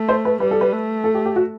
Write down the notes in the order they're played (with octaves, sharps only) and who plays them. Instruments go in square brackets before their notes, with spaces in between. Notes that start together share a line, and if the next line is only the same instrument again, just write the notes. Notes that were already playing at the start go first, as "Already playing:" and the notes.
Already playing: [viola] A3
[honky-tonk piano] C5
B4
[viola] G3 [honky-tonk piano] B4
[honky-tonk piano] A4
B4
[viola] A3
[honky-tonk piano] A4
G4
G4
F#4